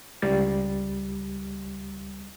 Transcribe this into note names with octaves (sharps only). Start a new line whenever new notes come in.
C#2 G3 A6